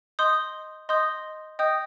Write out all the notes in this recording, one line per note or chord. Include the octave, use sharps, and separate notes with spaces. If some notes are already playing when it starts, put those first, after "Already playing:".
D#5 C6 D#6 G6
D#5 C6 D#6 G6
D#5 G5 D#6 G6